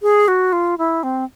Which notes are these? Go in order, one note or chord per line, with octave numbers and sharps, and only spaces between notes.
G#4
F#4
F4
E4
C4